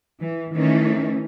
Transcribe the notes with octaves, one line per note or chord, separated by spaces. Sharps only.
E3
D#3 E3 A3 C#4